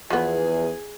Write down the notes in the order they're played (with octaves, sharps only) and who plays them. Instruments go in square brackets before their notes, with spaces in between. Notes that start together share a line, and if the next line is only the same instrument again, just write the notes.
[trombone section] E2 [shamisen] F3 B3 [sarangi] G#4